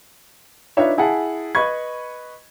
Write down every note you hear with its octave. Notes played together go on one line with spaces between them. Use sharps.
D4 D#4 F4 B4 C#5 E5
E4 G#4 F#5 A5
B4 D#5 B5 C#6 G#6